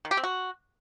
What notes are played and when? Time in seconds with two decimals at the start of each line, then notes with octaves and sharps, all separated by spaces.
0.05 D#3
0.11 G4
0.17 C4
0.24 F#4